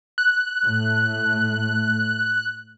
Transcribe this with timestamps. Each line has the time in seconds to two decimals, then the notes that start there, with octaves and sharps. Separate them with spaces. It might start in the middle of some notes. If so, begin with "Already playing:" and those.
0.18 F#6
0.63 A2 A3